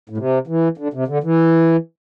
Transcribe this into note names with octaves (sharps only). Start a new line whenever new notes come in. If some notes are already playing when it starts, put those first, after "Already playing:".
A2
C3
E3
D3
C3
D3
E3